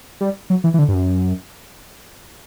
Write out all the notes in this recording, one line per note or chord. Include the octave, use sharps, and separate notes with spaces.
G3
F#3
E3
E3
D3
G2
F#2